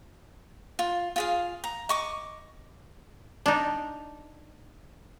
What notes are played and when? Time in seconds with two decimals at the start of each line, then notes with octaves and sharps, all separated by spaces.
0.79 F4
1.16 F4 G#4 F5
1.64 A#5
1.89 D#5 C#6 D6
3.46 D4 D#4